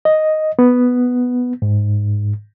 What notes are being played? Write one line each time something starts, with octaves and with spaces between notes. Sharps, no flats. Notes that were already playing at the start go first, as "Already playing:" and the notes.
D#5
B3
G#2